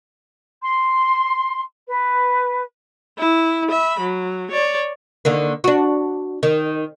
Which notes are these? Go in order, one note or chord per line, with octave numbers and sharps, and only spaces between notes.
C6
B4
E4
E5 B5
F#3
C#5 D5
D3 D#3 A#3
D4 F#4
D#3